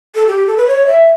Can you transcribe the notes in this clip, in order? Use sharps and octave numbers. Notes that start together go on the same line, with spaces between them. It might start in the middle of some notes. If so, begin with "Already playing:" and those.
A4
G4
A4
B4
C#5
E5